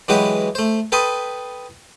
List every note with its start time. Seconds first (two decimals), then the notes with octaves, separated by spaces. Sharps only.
0.08 E3 F#3 G#3 F#4 G4 B4
0.55 A3 C5
0.92 A4 B4 G5 B5 C6 D#6